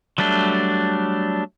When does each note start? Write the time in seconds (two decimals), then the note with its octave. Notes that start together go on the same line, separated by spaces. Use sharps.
0.18 F#3 G3 A3 D4